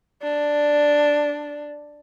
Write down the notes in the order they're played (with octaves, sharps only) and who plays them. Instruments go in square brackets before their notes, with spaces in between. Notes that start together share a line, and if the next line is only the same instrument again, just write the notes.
[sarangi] D4